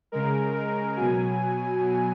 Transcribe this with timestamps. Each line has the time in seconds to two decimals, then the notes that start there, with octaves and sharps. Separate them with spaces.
0.12 C#3 G#3 A#4
0.54 A#4
0.96 B2 F#3 G#5
1.80 B2 F#3